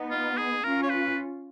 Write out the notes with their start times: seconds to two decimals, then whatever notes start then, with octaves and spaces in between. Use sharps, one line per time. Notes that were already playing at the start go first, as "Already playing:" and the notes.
Already playing: B3 D#4
0.11 F4
0.37 G#4
0.63 C#4 F4 A#4
0.83 C#5
0.90 B4